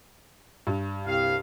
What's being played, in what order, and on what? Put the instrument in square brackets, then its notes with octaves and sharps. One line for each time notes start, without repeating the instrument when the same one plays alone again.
[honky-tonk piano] G2
[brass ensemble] C2 G4 F5